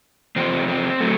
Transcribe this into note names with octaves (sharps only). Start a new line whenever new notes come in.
E2 C3 F3 C4
C4
F#3 A3